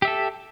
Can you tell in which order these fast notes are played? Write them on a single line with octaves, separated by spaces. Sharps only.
G4 E5 A4